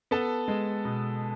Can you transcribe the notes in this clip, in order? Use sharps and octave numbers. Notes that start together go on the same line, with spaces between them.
B3 A4 A5
G#3
B2